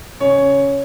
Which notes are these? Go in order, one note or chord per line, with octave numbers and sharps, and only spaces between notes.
C#3 C#5